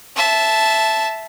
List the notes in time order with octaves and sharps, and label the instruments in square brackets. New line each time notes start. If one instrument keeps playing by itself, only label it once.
[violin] E5 A5